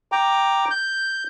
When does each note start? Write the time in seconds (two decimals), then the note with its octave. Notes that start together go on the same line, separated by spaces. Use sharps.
0.12 G5 A#5 D6
0.71 G6